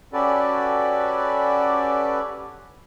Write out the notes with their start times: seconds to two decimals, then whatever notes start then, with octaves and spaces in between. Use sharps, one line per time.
0.13 C#4 F#4 G4 A4 B4 D5